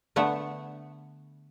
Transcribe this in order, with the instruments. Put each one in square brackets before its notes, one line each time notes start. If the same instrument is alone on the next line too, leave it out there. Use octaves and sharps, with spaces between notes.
[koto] D3 A3 B3 E5 F#5